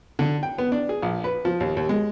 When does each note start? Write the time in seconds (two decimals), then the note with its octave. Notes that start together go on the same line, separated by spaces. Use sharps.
0.19 D3
0.43 G5
0.58 B3
0.72 D4
0.89 G#4
1.02 A#1
1.24 B4
1.45 F3
1.60 D#2
1.77 D#2
1.89 G#3